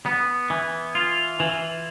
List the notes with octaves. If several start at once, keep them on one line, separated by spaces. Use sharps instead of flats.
B3
E3
F4
E3